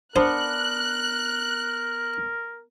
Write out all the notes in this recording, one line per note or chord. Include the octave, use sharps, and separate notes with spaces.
B3 D4 A#4 C5 F#5 F#6